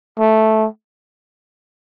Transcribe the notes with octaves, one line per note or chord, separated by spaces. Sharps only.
A3